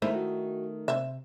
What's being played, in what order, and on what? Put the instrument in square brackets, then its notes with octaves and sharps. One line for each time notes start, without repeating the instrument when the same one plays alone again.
[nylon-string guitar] D#3 A3 D#4 [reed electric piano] G#3 [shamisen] E4 C5 E5
[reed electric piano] F#4
[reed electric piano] C3 [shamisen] C5 E5